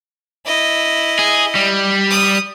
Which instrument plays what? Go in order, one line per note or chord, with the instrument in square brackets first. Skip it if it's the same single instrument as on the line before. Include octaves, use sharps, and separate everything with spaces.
[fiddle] E4 D#5
[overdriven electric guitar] G#4
G3
[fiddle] D#6